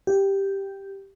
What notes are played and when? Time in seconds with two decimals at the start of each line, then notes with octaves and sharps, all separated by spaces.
0.07 G4